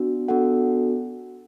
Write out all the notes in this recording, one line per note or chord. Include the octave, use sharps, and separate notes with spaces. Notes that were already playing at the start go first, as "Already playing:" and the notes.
Already playing: B3 D4 F#4
B3 D4 F#4 A4 F#5